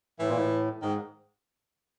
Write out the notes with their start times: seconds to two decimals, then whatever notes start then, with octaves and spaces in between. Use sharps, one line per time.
0.19 A2 E3
0.29 A#2
0.37 A2
0.82 G#2 D#3